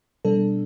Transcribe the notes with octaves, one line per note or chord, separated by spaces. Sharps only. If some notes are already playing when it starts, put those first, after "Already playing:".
B2 G3 D4 A4